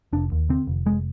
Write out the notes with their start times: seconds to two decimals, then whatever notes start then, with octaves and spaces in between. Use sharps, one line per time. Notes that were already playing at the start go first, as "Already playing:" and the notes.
0.13 F1 D4
0.32 D#2
0.49 D3 C4
0.67 F1
0.86 F1 G#3